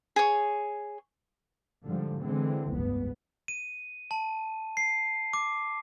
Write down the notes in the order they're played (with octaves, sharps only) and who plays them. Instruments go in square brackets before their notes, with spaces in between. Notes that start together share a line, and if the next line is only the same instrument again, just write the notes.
[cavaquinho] G#4 C#5
[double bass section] G#2 D3 F3 G3
D3 E3 G#3 C4
F1 C#2 G2 B3
[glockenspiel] D#7
A5
C7
D6